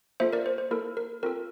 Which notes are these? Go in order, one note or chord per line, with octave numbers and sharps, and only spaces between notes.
A#3 F4 A4 C5 E5
A#4 D5
C5
C5
A#3 E4 A4 A#4
A#4
C4 F4 A4 A#4